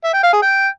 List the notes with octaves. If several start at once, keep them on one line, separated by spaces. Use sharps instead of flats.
E5
G5
F5
G#4
G5